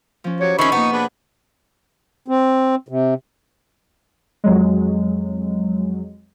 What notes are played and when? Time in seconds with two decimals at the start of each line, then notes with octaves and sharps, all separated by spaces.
0.24 F3 C#4
0.41 F#3 G4 C#5
0.59 D#3 C4 C#4 C#5 E5 B5 C#6
0.72 C3 A#3 B3 D#4
0.93 D4 G#4 B4
2.28 C4
2.88 C3
4.44 F2 F#3 G#3